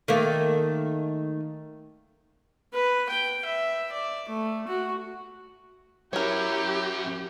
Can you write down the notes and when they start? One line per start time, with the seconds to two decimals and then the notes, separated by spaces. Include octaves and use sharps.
0.08 D#3 A3 A#3
2.73 B4
3.08 G5
3.44 E5
3.92 D5
4.29 A3
4.67 F#4
6.13 F#3 C#4 E4 G4 A#4 C#5